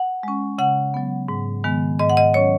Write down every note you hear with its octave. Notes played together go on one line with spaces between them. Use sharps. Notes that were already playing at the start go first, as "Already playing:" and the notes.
Already playing: F#5
G#3 C#4
C#3 F#5
F#3 B3
G#2
D#3 G#3 B3
G#2 D#5
F#5
D#5
F#3 C#4 C#5